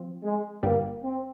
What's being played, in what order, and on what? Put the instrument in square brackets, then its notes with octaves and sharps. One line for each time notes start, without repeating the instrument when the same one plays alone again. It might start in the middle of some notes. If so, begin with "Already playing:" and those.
Already playing: [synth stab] F3 C4
[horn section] G#3
[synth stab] G1 G2 G3 [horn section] A#3
[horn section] C4